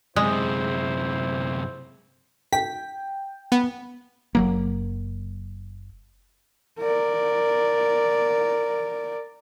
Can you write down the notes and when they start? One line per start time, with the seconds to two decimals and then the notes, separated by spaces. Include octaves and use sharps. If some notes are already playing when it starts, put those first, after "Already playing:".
0.16 F#2 C3 G#3 E4 C5
2.53 G5 B6
3.52 B3
4.35 F#1 F#3 A#3
6.80 A#4 D5